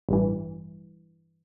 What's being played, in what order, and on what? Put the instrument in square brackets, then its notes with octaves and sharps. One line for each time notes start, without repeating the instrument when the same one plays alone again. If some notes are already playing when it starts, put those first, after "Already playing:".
[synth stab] A1 G2 E3